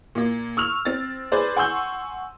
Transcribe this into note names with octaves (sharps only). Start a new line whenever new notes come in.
A#2 A#3
C#6 E6 F6 F7
C4 A6
G#4 B4 C5 D5
F#5 G#5 C6 C#6 E6 G6